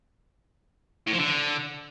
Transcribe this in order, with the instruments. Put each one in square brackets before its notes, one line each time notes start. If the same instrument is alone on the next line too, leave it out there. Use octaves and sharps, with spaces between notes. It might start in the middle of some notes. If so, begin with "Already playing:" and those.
[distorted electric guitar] A2
F3
D3